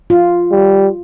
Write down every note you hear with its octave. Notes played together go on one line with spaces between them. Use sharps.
F4
G3